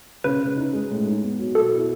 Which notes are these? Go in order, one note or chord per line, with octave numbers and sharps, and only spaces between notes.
C#3 B4
C#3
D#4
G#3
A2
D#4
B3
F#3
B2 A4
E4